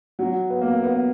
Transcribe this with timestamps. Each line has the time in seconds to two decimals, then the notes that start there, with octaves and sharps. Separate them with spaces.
0.19 F#3
0.50 B3
0.61 A#3
0.83 B3